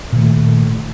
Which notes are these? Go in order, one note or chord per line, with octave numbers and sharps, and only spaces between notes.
A#2 D#3 A3